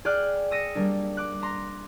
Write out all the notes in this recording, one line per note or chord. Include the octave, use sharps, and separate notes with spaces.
G#4 D5 G5 F6 F#6
D#6 E6 A#6 C#7 D#7
G3 A#3 D4
D6 F#6
A#5 C6